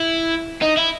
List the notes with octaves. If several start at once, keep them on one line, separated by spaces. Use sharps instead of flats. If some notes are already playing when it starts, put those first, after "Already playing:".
Already playing: E4
D#4
E4